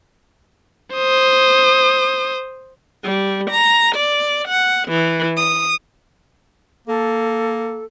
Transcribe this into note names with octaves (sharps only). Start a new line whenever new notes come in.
C5 D#6
G3
A#5
D5
F#5
E3
D#6
A#3 A4